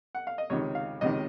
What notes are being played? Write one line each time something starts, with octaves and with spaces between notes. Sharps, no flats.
F#5
F5
D#5
C#2 C3 D#3 C#5
F5
C#2 C3 D#3 D#5